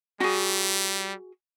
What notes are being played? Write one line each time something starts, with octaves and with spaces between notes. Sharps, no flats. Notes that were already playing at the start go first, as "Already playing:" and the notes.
G3 F#4 G#4